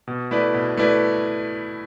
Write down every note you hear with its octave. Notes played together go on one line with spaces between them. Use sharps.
B2
A3 E4 B4 D5
B2
A3 E4 B4 D5